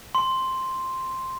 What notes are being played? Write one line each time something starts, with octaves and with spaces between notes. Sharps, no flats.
C6